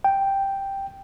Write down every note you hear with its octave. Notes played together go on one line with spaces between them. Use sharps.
G5